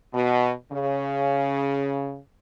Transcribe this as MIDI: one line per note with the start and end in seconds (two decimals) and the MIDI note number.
0.13 0.51 47
0.72 2.18 49